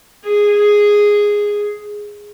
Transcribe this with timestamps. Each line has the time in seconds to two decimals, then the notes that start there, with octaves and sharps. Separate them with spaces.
0.24 G#4